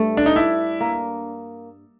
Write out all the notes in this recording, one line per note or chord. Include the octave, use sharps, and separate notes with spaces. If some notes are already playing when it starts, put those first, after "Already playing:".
Already playing: G2 A3
D4
D#4
D4 E4
A#3